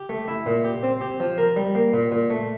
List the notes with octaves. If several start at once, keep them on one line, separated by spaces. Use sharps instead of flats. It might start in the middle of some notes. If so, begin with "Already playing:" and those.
Already playing: G4
A3
E4
A#2
G4
C4
G4
F3
A#4
G3
A#3
A#2
A#2
A3